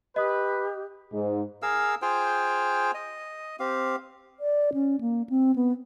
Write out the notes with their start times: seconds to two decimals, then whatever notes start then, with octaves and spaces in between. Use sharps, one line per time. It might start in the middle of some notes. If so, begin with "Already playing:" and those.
0.16 G4 B4 D#5 D#6
1.13 G#2
1.62 G#4 A#4 F5 E6
2.02 F4 G#4 C5 G5
2.94 D#5
3.59 C4 G4 F5
4.40 D5
4.74 C#4
5.01 A#3
5.30 C4
5.56 B3